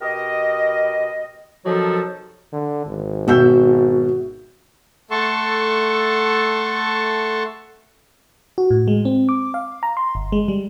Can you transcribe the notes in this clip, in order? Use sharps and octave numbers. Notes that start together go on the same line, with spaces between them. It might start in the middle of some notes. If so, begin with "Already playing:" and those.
B2 G4 A#4 D#5
C3 D#3 F3 F#3 F#4 A4
D3
G#1
B2 F#4 E5 E6 G6
A3 A4 F#5 A5 C6 C#6
F#4
A2
G#3
C4
D6
F5
A#5
C6
G1
G#3
G3